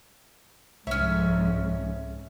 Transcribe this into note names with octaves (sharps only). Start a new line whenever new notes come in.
C2 F2 G#2 C#4 C#5 E5